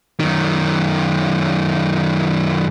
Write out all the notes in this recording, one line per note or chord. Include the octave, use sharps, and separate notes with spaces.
F#2 D#3